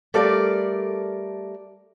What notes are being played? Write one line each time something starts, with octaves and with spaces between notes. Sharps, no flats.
G3 A3 A4 A#4 D5 F5